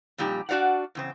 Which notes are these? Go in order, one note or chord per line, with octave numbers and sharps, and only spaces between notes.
F2 A#2 G3 D#4 G4
D4 F#4 D5 F5 F#5
E2 C#3 C4